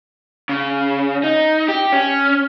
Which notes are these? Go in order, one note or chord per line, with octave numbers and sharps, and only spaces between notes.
C#3
D#4
G4
C#4